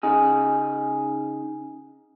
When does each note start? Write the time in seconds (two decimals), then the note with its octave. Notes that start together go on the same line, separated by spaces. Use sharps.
0.03 C#3 D#4 G#4